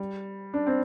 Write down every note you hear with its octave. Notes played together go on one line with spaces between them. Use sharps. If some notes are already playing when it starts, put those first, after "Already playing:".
Already playing: G3
D4
C4